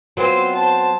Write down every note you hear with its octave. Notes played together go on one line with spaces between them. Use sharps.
F#3 B3 C4 F4 C5
C5 A5